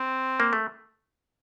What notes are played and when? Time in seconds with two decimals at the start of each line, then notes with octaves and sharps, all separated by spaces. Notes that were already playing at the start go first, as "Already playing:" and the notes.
Already playing: C4
0.40 A#3
0.53 A3